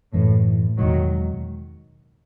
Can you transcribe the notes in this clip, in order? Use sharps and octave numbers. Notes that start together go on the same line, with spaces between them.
F#2 A2 E3 A3
E2 B2 D#3 F#3 G#3